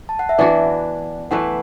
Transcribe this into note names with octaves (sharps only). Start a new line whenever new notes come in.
A5
F#5
E5
E3 B3 D4 F#4 D5
E3 A3 E4 B4 F#5